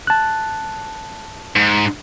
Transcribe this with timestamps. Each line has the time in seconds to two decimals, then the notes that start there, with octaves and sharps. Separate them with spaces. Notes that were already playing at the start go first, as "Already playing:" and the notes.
0.07 A5 F#6
1.56 G#2